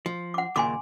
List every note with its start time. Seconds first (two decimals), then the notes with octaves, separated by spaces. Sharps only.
0.06 F3
0.34 F#5 D6
0.56 D#2 A#2 C#3 G#5 C6 D6